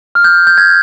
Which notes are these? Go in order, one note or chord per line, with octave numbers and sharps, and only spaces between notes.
F6
G6
G6
G#6